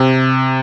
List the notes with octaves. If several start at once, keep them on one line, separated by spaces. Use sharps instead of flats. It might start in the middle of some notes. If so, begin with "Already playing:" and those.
Already playing: C3